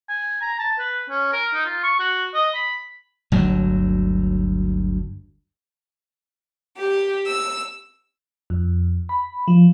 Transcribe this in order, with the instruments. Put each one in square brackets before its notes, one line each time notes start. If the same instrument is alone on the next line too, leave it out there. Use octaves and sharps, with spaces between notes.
[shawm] G#5
A#5
A5
B4
C#4
A#4
D#4
F4
C#6
F#4
D#5
B5
[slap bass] G1 D2 F#3
[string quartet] G4
E6
[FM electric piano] F2
B5
F3